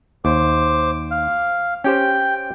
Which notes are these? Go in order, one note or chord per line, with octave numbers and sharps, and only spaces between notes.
D#2 C5 D6
F5
C#4 G4 C5 G5